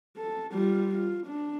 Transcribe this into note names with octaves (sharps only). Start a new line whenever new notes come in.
A4
G3 F4
F4
D4